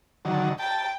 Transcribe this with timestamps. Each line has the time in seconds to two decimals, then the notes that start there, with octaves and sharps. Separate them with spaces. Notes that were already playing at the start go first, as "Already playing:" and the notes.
0.25 D3 D#3 F#3
0.60 G5 A5